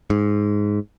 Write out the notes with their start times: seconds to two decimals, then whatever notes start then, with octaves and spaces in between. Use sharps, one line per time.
0.10 G#2